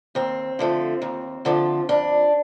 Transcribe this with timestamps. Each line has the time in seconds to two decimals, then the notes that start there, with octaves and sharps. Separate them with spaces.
0.15 D#2 C4
0.59 D3 F3 A3
1.02 D#2
1.45 D3 F3 A3
1.89 F2 D4